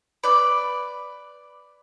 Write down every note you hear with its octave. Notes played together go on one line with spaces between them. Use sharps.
B4 D5